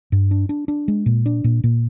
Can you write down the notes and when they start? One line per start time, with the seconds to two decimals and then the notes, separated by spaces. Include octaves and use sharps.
0.12 G2
0.31 D4
0.49 D4
0.68 D4
0.88 G#3
1.06 A#2
1.26 D4
1.44 A#2
1.64 A#2